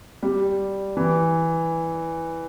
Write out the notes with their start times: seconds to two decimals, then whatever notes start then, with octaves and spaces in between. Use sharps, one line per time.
0.23 G3
0.97 E3